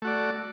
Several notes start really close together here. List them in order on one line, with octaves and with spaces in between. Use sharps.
A3 F#4 D5